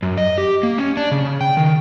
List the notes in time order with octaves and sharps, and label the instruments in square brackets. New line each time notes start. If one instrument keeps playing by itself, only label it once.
[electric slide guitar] F#2
D#5
G4
A#3
C#4
D4
C#3
G5
D#3